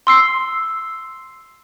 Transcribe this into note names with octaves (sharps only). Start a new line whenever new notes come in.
C6 E6 C7